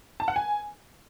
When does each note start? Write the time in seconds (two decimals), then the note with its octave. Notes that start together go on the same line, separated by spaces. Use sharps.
0.20 A5
0.28 F#5
0.36 G#5